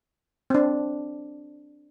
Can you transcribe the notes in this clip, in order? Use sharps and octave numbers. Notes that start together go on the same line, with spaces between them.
C4 D4